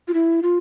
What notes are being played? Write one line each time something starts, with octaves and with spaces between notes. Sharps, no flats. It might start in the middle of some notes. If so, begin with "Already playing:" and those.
F4
E4
F4